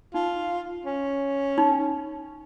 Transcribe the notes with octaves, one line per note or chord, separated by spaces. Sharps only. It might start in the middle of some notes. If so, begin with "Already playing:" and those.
D#4 F4
C#4
D#4